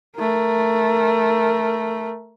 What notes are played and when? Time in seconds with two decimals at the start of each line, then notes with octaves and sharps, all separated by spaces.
0.18 A3 A#4